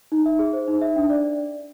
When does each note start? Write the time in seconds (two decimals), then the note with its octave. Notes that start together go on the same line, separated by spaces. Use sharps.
0.12 D#4
0.26 E5
0.39 G#4
0.53 C5
0.68 D#4
0.82 E5
0.96 D4
1.10 D5